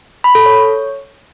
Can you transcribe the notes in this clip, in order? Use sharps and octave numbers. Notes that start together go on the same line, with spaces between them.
B5
A4
C#5